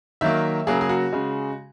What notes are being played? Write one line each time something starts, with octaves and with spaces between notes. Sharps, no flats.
D#3 F#3 A#3 E5
C#3 F#3 A#3 G#4
G#4
F#4
C#3 G#3